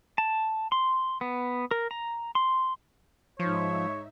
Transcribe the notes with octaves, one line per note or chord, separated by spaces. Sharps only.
A5
C6
B3
A#4
A#5
C6
G#2 F3 D#4 C#5 E5